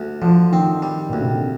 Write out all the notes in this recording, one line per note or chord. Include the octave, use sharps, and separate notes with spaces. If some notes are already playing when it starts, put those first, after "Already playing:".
Already playing: D2
D3 F3
D#3 C4
G3
D2 A#2
C3
D3